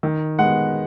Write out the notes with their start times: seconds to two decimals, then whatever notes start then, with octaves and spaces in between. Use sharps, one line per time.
0.03 D#3
0.39 G#3 B3 F#5